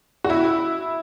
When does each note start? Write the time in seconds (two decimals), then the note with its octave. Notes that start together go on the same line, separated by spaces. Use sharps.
0.24 F#4
0.30 E4